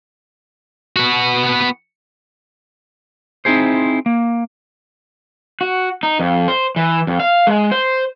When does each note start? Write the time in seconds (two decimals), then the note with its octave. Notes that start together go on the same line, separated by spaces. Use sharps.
0.96 B3 F#4
3.45 C4 D#4 E4 G#4 C5
4.06 A#3
5.61 F#4
6.03 D#4
6.20 F2
6.48 C5
6.76 E3
7.07 F2
7.20 F5
7.47 G#3
7.71 C5